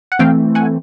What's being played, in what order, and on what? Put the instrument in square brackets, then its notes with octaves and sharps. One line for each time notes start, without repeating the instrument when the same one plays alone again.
[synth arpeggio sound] F#5
E3 A3 C4 F5 G5
F#5 G#5